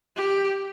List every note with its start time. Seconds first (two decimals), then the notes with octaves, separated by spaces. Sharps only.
0.16 G4